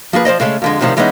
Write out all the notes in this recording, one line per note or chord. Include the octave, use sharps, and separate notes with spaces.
F3 A#3 G#4 B4
F3 C5 D5 D#5
C#3 G#3 A3 C#4
F2 D3 G#3
A2 C3 D#3 F3 G3
E3 G#3 B3 C#4 D#4